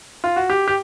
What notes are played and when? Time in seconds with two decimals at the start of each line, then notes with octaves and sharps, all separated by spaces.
0.24 F4
0.36 F#4
0.50 G4
0.68 G4